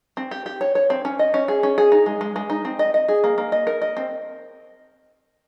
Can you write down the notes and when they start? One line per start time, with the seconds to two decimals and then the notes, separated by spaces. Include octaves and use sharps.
0.17 C4
0.31 G4
0.46 G4
0.61 C#5
0.75 C#5
0.90 C4
1.05 C#4
1.19 D#5
1.34 C#4
1.48 G#4
1.63 C#4
1.78 G#4
1.92 D#4
2.06 G#3
2.21 G#3
2.36 G#3
2.50 D#4
2.65 C4
2.79 D#5
2.94 D#5
3.08 G#4
3.24 A#3
3.38 A#3
3.52 D#5
3.67 A#4
3.82 D#5
3.97 C4